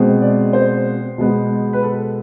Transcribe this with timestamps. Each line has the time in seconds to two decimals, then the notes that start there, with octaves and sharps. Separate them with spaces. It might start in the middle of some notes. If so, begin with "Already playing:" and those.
Already playing: B2 G#3 C4
0.22 D5
0.53 C5
1.18 B2 G#3 B3
1.73 B4
1.83 A4